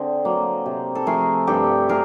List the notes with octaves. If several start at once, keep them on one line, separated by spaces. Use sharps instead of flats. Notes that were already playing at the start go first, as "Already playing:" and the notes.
Already playing: D3 C4 G#4
F#3 A#3
C3
A4
F3 A3 G#4 A#4
G2 G4 A4
A#3 G#4 A#4